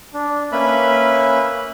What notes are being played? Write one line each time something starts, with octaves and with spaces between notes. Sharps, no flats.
D4
A#3 C#4 B4 E5 B5